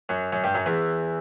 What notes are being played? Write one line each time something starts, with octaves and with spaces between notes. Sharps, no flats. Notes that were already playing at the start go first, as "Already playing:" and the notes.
F#2 F#3
F#2 F#3
G2 G3
F#2 F#3
E2 E3